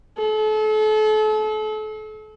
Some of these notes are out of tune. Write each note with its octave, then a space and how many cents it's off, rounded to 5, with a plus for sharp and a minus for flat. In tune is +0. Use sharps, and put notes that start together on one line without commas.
A4 -35